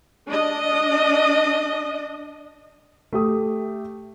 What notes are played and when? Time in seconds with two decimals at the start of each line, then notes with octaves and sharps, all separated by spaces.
0.28 D4 D#5
3.13 A3 G4 D#6